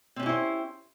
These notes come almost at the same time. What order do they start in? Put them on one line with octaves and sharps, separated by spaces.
C4 C#4 G4 E4 C5